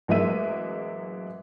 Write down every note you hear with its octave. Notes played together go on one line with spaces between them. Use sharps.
A1 F#3 G#3 A#3 E5 D#7